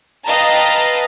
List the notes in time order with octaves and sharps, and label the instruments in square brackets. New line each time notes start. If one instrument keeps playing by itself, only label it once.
[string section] B4 D#5 F5 G5 A5 A#5